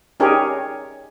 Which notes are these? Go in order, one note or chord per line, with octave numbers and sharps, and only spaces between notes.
C#4 D#4 G4 G#4 A#4 C#5